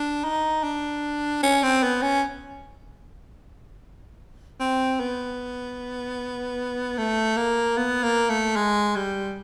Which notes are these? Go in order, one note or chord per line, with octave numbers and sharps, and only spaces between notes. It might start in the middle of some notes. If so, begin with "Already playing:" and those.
Already playing: D4
D#4
D4
C#4
C4
B3
C#4
C4
B3
A3
A#3
B3
A#3
A3
G#3
G3